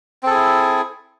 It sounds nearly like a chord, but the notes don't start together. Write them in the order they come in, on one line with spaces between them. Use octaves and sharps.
C4 A4 G#4 E4